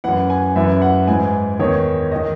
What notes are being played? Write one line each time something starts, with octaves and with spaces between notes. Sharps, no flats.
F#2 E3 F#5
G#5
F#2 E3 E5
F#5
G#2 E3 G#5
E2 D#3 C#5
D#3 D#5